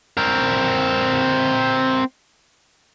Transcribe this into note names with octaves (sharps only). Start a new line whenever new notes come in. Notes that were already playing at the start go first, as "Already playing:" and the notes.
C4 A#4